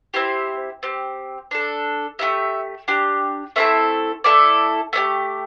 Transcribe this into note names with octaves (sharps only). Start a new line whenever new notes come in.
C4 E4 G4 C5
C4 G4
D4 A4
A3 E4 G4 E5
D4 G4
A3 C4 E4 A4 E5
A3 E4 A4 D5
A3 D4 G4